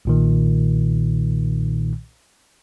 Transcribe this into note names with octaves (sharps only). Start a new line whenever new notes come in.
B1 A#2 D#3